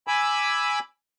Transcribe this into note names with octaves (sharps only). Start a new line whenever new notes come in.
G#5 B5 D6 E6